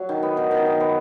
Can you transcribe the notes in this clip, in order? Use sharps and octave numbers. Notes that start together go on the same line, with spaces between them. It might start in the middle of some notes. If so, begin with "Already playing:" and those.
Already playing: F#3
D#3
B3
D#3
D#3
D#3
B3